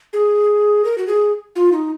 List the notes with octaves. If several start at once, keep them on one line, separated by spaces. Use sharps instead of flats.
G#4
A#4
F#4
G#4
F4
D#4